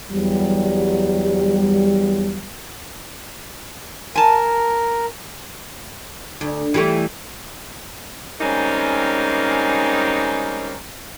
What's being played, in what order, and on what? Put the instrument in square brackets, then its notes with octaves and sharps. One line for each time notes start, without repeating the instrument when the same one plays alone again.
[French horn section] E2 F#3 G3
[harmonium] A#4 [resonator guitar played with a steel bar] G#5 A5
[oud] D2
E3 G3 A3
[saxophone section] G3 G#3 A#3 C4 C#4 D#4